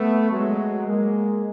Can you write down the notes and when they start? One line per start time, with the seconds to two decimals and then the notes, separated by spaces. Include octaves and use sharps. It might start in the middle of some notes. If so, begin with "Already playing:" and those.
Already playing: A3 B3
0.31 F#3 G#3
0.86 G#3 A#3